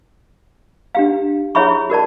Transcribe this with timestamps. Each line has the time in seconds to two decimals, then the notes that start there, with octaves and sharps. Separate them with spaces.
0.95 D4 G4 F5
1.55 E4 G#4 C#5 E5 B5 C#6
1.90 F#4 A#4 D5 A5